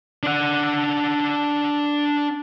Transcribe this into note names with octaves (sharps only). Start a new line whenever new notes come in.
D4 F#5